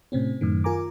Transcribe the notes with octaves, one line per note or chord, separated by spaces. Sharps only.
A2 C3 C4 C#4
F#2 A2 D#3
F4 A#4 G#5 A#5 D6